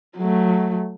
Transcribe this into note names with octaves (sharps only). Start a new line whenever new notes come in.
F#3 A3